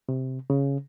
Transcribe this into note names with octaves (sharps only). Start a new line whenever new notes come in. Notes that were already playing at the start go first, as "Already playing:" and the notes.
C3
C#3